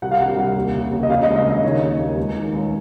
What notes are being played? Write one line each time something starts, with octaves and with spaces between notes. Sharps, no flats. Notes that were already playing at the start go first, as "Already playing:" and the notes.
C2 F#5
F5
C2 F#5
C2
D#2
C#3
D#2
D#5
C#3 F5
D#5
C#2
D#5
C#3
D#5
D#3 C#5
D#2
D#2
C#2
D#3
C#2